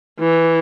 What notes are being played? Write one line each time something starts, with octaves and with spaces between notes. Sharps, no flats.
E3